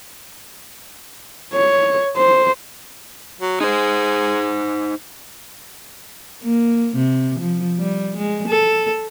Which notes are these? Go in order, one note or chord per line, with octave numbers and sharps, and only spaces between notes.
C#5
C5
F#3
G#3 D#4 C5
A#3
C3
F3
G3
G#3
A4